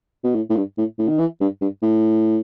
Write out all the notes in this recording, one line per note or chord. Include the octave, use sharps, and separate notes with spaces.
B2
A2
A2
G2
A2
A2
D#3
E3
G2
G2
A2